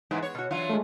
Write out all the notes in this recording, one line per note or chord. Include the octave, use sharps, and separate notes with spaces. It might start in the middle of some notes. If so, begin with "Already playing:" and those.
G#2 C#3 E3 G#3 B3
C#5
B2 F#4
E3 F#3 D4 F4 C#5
G#3 A3